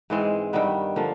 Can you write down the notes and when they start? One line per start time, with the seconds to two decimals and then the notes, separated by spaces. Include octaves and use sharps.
0.10 G#2 E3 G#3 C4
0.53 G2 D#3 G3 B3
0.96 D3 F3 A#3